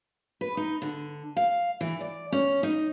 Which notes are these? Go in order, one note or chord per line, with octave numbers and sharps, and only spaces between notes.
B4
D#4
D3
F5
E3
D5
C#4
D#4